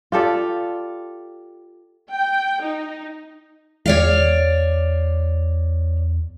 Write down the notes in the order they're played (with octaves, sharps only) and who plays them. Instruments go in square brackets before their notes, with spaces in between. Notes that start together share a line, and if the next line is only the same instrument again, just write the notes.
[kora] F4 G4 A4 D5
[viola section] G5
D#4
[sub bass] E2 [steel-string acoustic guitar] C#5 D5 F5